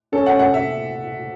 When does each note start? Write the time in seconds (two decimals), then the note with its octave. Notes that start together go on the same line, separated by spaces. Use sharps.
0.13 C#4 A4
0.26 F#5
0.39 F#5
0.54 E5